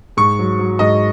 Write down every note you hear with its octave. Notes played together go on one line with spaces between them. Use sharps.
G#2 C#6
F#3
F#3
G#2 D#5